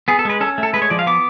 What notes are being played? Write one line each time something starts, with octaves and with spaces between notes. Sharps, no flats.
B3 G#4
A4
G#3 B4
C#4 A4
A3
A4
G#3 B4
C#5
F3 D5
F5
B3 D6